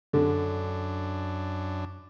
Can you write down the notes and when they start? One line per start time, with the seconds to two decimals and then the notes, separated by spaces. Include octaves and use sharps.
0.13 F#2 D3 D4